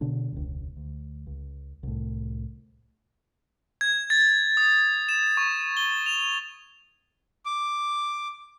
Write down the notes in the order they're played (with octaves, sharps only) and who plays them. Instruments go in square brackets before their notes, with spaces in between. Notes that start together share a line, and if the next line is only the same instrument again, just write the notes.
[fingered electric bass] B2 D3 D4
E1 C#2
D2
C#2
C2 A2
[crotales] G#6
A6
D#6
E7
C#6
G7
F7
[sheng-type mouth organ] D6